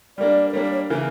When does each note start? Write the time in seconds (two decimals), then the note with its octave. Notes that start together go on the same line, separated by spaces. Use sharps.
0.18 G3 A#3 D4 D5
0.49 A#4
0.53 G3 A#3 D4 C#5
0.63 D5
0.72 C#5
0.90 C#3 E3 A#3 A#4